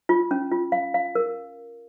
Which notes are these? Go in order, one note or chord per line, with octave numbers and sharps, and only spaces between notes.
F4
C#4
F4
F5
F5
A#4